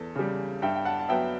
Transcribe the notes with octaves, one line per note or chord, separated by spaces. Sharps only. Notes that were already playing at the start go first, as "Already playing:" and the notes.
Already playing: E2 A4
C#3 G3
G2 E5 G5
G5
F#5 A5
A5
F#3 B3 E5 G5